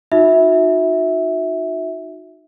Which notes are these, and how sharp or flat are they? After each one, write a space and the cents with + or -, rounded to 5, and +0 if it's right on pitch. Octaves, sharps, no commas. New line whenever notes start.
D#4 +0 F#4 -35 E5 -15